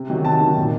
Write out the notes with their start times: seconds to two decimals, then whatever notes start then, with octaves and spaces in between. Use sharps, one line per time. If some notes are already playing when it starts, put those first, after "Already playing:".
Already playing: C3
0.09 D#3 F#3
0.25 C3 A5
0.41 D#3 F#3
0.57 A#2